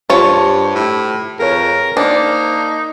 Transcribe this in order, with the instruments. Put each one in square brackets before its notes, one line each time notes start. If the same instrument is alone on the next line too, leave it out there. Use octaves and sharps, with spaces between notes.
[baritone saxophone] G2 [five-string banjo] F4 C#5 [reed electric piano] G4 C5 A5
[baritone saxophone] A2
[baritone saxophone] F2 [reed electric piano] G#4 B4 C#5 [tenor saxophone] A#4
[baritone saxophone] A#3 [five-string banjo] D4 [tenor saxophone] D#4 [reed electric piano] C5